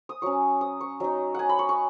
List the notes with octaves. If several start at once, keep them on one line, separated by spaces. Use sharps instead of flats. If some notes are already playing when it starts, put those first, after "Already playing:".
D#6
F#3 C#4 C#6
D#6
C#6
F#3 D#4 D#5
F#5 G#5
B5
C#6
C#6